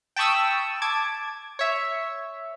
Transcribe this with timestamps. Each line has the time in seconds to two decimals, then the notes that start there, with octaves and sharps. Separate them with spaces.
0.16 G5 A5 B5 C#6 D#6 E6
0.82 A5 D6 G#6
1.59 C#5 E5